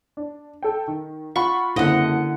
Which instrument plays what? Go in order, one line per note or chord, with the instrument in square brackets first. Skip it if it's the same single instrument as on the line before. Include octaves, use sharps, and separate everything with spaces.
[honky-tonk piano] D4
A4 G5
D#3
[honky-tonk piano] F4 F#5 B5 [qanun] C#6
[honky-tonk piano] F#1 C4 [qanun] D3 D#5 [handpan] E4 F#5